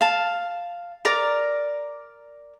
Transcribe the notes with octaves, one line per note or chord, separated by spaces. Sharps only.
F5 A5
A#4 D5 A#5